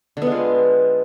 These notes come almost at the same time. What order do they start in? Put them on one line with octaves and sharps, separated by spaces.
D3 B3 G#3 F4